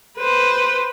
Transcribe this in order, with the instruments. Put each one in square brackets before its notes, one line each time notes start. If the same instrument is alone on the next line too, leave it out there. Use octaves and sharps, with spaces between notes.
[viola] B4 C5